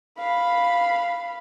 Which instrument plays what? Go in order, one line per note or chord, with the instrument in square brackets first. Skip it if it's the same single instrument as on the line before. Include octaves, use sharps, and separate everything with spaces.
[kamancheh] F5 B5